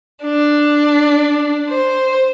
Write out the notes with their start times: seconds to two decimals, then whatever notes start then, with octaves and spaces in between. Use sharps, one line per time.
0.23 D4
1.69 C5